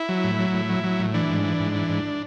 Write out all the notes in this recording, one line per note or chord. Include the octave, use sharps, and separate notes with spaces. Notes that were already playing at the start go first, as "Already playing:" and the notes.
Already playing: E4
F#3
A2
F#3
A2
F#3
F#3
A2
E3 D4
G#2
E3
G#2
E3
G#2